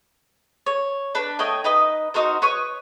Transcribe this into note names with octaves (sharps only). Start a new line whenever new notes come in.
C#5
D4 B4
A3 C#5 D#5 G5
D#4 B4 D#5
D#4 F#4 A#4 C5
B4 C#5 C#6 D#6